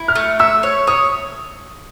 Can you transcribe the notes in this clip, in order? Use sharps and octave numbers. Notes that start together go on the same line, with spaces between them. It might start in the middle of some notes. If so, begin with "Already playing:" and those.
Already playing: E4
F6
A3
E5 E6
C#5
C#5 D#6